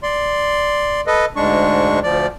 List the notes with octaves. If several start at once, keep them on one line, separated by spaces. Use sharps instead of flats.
D5 C6
A4 B4 D#5
D2 G#2 G#3 D4 C#6
D2 F3 D5